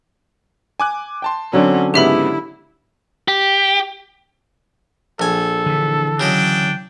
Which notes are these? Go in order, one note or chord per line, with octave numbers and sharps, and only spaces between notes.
G#5 D6 F#6
G5 A5 C6
D3 F#3 C4 C#4
G#2 C#3 B3 E4 G4 E5 B5
G4
A#1 A4 G#5
D3 E3
C#3 F#3 D4 D#5 G5